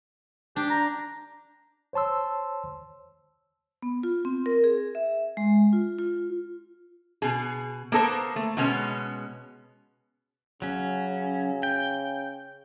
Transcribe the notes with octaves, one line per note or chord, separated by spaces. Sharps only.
D4 G4
A#5
C5 C#5 A5 C6 E6
B3
F4
C4
A#4
G#4
E5
G#3
F4
F4
B2 G#4
A#3 B3 A4 A#4 C5
A3
B2 G#3 B3 C#4
C#3 F#3 C#4
G5